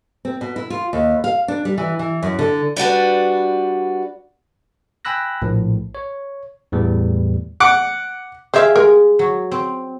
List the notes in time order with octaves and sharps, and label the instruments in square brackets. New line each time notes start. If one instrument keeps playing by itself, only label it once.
[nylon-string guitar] C4
B2
E4
F4
D#2
F5
D4
G3
E3
E3
F#2
D3
[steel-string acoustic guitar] G3 D4 F#4 B4
[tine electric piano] G5 G#5 B5 E6 F#6 A#6
A#1 A2
C#5
E2 A2 E3 G3
[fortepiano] F#5 D6
[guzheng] G4 G#4 F5 [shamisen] C5 E5
[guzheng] G#3 [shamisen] A#4
[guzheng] F#3
C4